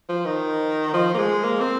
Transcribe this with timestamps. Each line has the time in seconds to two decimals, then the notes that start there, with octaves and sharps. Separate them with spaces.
0.09 F3
0.26 D#3
0.93 F3
1.14 A#3
1.18 G#3
1.44 A#3
1.61 C4